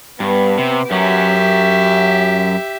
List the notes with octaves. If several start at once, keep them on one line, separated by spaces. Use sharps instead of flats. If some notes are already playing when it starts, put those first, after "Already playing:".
G2 B3
C3
F#2 F#3 G4 E5